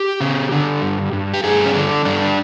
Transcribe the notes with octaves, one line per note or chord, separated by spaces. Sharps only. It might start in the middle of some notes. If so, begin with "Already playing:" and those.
Already playing: G4
C#3
D3
G2
G2
G4
G2 G#4
C#4
D3 D4
G2 D4